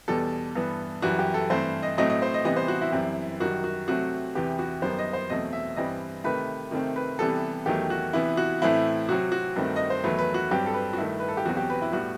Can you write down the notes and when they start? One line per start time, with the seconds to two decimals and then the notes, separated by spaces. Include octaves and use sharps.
0.08 E2 B2 G3 A4
0.56 G2 E3 B3
1.02 F#2 E3 G3 F#4
1.19 G4
1.34 A4
1.50 G2 E3 A3 C4 C5
1.83 D#5
1.98 A2 F#3 A3 C4 D#5
2.10 D#5
2.22 C5
2.34 D#5
2.45 C3 E3 G3 B3 D#5
2.56 C5
2.68 F#4
2.81 E4
2.92 F#2 E3 G3 C4
3.40 F#2 D#3 G3 F#4
3.64 F#4
3.88 C3 F#3 A3 C4 F#4
4.35 E2 C3 E3 B3 G4
4.59 F#4
4.82 F#2 D#3 G3 B3 C5
4.99 D#5
5.13 C5
5.30 E2 B2 F#3 A3 C4 D#5
5.53 E5
5.76 G2 E3 G3 C4 D#5
6.24 C3 D#3 A3 B4
6.71 C3 D#3 A3 C4
6.96 B4
7.19 C3 E3 G3 B3 A4
7.66 E2 D#3 F#3 A3 G4
7.90 F#4
8.13 C3 E3 B3 E4
8.37 F#4
8.62 A2 E3 A3 C4 E4
9.09 C3 F#3 C4 F#4
9.32 F#4
9.56 G2 D#3 A3 C4
9.76 D#5
9.90 C5
10.04 E2 D#3 F#3 A3 B4
10.19 B4
10.34 F#4
10.51 G2 F#3 C4 G4
10.66 A4
10.74 B4
10.93 F#4
10.98 G2 D#3 A3 E4
11.20 B4
11.29 A4
11.37 G4
11.45 E2 B2 F#3 C4 F#4
11.57 G4
11.70 B4
11.82 E4
11.92 A2 G3 B3 F#4